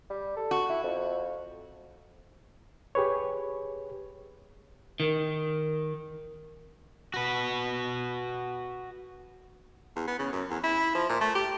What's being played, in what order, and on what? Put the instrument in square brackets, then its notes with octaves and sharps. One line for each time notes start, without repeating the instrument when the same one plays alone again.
[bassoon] G3
A4
[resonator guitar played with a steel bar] F#4
[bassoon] E4
F2
[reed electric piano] G4 G#4 B4 C#5
[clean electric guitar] D#3
[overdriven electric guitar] F#4 B4
[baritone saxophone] E2
B3
C#3
F#2
E2
E4
F3
A#2
A3
G4